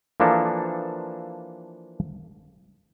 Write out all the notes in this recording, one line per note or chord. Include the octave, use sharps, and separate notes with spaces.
E3 F3 A#3 D4 A4